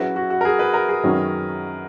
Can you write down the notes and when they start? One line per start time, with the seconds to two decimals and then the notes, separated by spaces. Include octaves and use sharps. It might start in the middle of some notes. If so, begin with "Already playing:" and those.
Already playing: F#3 C#4 E4 F#4 G#4 B4
0.16 F#4
0.30 F#4
0.41 A#4
0.45 G#4
0.59 B4
0.74 A#4
0.89 G#4
1.03 F#2 D#3 F#3 C#4